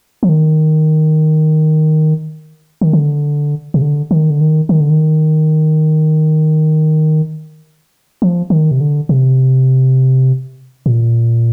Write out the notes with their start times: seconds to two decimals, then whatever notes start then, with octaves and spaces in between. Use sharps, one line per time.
0.23 F3
0.29 D#3
2.81 D#3
2.93 D3
3.74 C3
3.82 D3
4.11 D#3
4.30 D3
4.41 D#3
4.69 D#3
4.80 D3
4.90 D#3
8.22 F3
8.50 D#3
8.71 C3
8.80 D3
9.09 C3
10.86 A#2